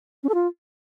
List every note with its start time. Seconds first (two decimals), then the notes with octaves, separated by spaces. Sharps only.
0.23 C#4
0.29 A4
0.34 F4